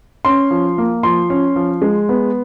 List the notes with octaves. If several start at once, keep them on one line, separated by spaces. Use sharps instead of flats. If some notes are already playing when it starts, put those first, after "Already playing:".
C#4 C6
F3
A#3
F3 C6
C#4
F3
G#3
B3